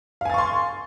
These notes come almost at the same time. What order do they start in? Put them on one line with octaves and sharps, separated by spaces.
F5 G#5 A6 C#6 C6